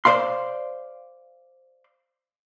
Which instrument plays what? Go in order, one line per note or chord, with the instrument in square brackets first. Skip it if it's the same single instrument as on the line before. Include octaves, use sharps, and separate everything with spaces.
[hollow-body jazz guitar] C5 D5 F5 C6